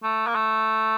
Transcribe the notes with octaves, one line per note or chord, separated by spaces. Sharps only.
A3
A#3
A3